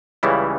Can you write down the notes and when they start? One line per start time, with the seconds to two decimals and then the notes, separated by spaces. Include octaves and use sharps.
0.23 C#2 C#3 E3 G3 E4